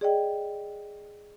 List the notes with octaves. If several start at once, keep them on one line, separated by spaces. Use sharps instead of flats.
G#4 D5 D#5 G5